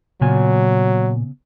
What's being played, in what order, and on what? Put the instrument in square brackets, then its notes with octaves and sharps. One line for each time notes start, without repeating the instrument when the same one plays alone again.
[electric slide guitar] A#2 G#5 [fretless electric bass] C#3 B3 [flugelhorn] F#3